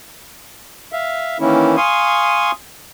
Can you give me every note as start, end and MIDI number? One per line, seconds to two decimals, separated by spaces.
0.92 1.37 76
0.92 1.37 77
1.40 1.76 51
1.40 1.76 52
1.40 1.76 58
1.40 1.76 61
1.40 1.76 64
1.77 2.51 77
1.77 2.51 80
1.77 2.51 84
1.77 2.51 85
1.77 2.51 87